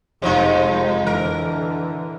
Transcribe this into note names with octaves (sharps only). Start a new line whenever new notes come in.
F1 B2 F3 G#3 D#4
D3 E3 A#4